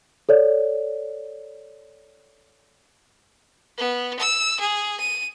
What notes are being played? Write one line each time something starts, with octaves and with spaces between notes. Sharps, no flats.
A4 C#5 D5
B3
E6
G#4
D#7